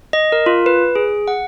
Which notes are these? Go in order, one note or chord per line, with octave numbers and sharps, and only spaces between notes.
D#5
A#4
F4
B4
G#4
F#5